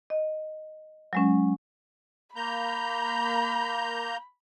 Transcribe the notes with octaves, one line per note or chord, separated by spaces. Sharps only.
D#5
F#3 G#3 C#4
A#3 A#5 B5 G6